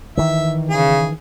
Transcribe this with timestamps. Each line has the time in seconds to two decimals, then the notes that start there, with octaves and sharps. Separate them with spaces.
0.17 D#3 E3 E5
0.70 C#3 G#4